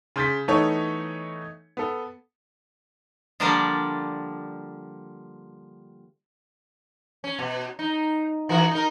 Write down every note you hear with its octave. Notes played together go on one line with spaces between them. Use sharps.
C#3 C6 G6 A6 B6
E3 A3 B3 D#4 A4 C#5
B3 A4
D3 F3 G3 A#3 D4 D5
C#4
B2
D#4
E3 F#4 A#4
D#4 A#4